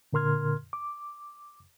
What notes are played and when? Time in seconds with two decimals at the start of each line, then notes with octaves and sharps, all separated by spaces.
0.13 A#2 D3 A#4 C6 F6 G#6
0.73 D6